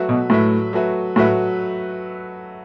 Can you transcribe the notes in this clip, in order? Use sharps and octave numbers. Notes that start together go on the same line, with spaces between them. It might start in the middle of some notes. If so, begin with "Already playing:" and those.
Already playing: F#3 A3 F#4 B4 E5
B2
A2 F#3 A3 F#4 B4 E5
F#3 A3 F#4 B4 E5
A2 F#3 A3 F#4 B4 E5